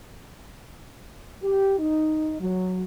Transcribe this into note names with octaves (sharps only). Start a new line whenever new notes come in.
G4
D#4
F#3